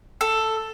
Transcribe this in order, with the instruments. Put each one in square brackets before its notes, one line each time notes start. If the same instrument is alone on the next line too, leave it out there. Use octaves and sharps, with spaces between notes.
[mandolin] A4